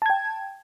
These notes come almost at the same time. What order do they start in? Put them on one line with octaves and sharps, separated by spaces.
A5 G#6 G5